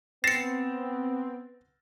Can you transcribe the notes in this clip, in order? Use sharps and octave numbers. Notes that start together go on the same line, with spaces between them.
B3 C4 A6 A#6 C7 C#7 E7